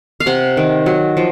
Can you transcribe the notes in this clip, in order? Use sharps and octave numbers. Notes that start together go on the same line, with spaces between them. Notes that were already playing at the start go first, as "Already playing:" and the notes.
F5
C3 F#5
D#3
F#3
F3